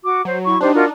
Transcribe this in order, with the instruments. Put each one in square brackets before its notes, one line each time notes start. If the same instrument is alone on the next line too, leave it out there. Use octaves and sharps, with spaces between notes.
[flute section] F#4 D6
[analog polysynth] F#3 [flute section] C5
[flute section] E4 C#6
[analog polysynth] D4 D#4 [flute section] G4 C5
[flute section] F4 F#4 A#4